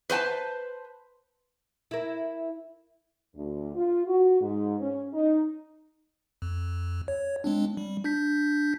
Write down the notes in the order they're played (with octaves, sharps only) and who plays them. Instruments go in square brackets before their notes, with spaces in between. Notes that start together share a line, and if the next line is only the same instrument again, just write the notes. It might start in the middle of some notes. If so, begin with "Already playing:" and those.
[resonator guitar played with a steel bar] B4 C5 G5 A5
[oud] E4 A#4
[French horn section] D2
F4
F#4
G#2
C#4
D#4
[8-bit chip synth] F2
C#5
G#3 C4 D4
G3
D4 G6 B6